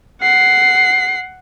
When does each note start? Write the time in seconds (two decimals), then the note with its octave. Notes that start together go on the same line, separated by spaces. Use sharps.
0.21 F#5 C7